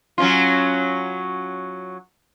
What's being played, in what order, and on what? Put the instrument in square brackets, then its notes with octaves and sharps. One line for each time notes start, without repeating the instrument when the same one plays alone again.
[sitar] F#3 C#4 F4